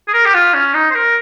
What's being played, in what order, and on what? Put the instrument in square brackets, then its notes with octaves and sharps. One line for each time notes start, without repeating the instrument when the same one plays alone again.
[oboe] G#4
A#4
G4
F4
C#4
D#4
C5
A#4